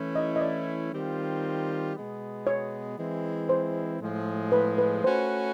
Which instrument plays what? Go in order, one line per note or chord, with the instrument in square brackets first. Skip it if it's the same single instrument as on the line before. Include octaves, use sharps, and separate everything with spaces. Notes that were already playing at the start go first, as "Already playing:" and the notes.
Already playing: [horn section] E3 A3 C#4 E4
[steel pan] D#5
D#5
D5
[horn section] D#3 G3 C4 F4
B2 G#3 B3
[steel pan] C#5
[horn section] E3 G#3 C4 E4
[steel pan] C5
[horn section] A2 F3 G#3
[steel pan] B4
B4
[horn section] A3 C#4 F#4 B4 [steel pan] C5